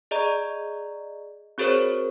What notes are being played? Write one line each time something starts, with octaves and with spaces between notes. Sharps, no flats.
G#4 D5 D#5 A#5
C4 F#4 G#4 A#4 C5 C#5